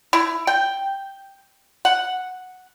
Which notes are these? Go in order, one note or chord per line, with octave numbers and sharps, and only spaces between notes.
E4
G5
F#5